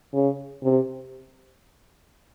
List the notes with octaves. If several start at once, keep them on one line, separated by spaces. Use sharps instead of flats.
C#3
C3